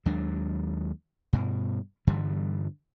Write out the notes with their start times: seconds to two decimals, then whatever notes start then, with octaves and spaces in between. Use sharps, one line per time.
0.06 D#2 F#3 G#3 D4
1.33 G2 B2
2.07 G2 D3 E3 G3